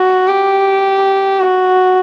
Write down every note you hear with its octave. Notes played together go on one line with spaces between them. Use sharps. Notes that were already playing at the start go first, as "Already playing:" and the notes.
Already playing: F#4
G4
F#4